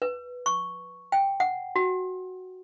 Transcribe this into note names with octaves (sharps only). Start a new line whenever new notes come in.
B4
C#6
G5
F#5
F#4